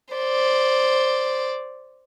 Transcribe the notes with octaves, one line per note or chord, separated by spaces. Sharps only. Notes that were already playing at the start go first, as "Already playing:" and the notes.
C5 D5